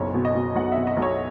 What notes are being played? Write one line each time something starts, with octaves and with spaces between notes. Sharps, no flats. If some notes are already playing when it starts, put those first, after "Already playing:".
Already playing: F#1 B1 C#5
B2
D#5
B2
B1 F#5
B2 E5
D#5
B1
C#5